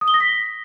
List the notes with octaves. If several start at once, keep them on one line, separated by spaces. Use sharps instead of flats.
D#6
G7
A#6
B6